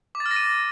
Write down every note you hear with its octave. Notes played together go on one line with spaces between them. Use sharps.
D6
A6
F6
A#6
D#7